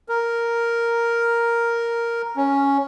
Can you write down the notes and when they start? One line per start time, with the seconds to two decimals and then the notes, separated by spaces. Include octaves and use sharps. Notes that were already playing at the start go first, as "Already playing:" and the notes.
0.09 A#4
2.36 C#4